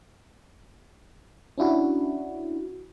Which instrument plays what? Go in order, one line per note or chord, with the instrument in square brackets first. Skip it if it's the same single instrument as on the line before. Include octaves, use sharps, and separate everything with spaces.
[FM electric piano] C#4 D4 E4 F#4